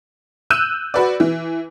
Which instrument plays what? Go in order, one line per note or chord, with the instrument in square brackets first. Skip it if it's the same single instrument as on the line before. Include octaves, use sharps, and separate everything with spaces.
[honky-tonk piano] E6 F#6 G6 D#7 E7
F#4 B4 D5
E3